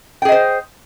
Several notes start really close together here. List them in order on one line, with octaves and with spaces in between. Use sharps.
G5 G#4 D#5 C5